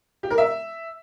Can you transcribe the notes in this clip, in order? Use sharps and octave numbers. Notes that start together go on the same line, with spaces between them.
G4
A#4
E5